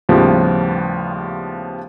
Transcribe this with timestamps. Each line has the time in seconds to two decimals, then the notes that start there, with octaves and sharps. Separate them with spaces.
0.09 D#2 A2 C#3 F3 G3 B3